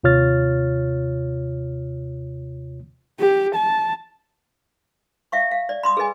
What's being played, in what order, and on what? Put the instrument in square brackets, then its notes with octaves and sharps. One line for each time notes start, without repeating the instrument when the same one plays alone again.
[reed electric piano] D#2 C3 F4 C#5 F6 A6
[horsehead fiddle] G4
A5
[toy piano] E5 F5 C#6
F5
D5
B5 C6 D#6
G#4 A4 B4 D#5 G#5